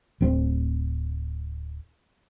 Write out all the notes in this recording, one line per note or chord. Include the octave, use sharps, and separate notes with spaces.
D1 C4